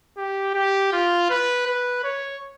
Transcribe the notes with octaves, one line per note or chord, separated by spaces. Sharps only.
G4
G4
F4
B4
B4
C#5